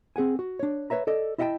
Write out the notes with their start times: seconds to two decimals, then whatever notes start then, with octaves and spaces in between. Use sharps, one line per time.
0.16 C4 G#4 F#5 G#5
0.39 F#4
0.59 D4 C#5
0.90 B4 C#5 E5 A#5
1.07 A4 D5 D#5
1.38 E4 D#5 E5 F#5 G5 A5